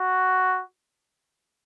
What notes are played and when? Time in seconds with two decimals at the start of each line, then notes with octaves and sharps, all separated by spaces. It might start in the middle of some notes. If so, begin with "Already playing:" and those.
Already playing: F#4